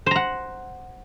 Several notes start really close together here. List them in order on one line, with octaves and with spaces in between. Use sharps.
C5 A#5 F#5